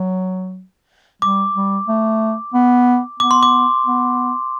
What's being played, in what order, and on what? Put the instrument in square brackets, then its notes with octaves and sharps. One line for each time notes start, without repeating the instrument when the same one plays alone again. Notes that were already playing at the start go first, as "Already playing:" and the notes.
Already playing: [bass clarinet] F#3
[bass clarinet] G3 [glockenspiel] D6
[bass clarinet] G3
A3
B3
[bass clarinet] B3 [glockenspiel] D6
[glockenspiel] C6
D6
[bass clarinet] B3